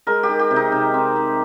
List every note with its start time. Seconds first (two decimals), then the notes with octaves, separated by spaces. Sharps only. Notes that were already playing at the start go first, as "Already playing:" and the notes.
0.07 G#3 A#4
0.23 G4
0.29 D#3
0.39 G4
0.51 C3
0.56 D#4
0.72 C3
0.94 C4
1.16 C4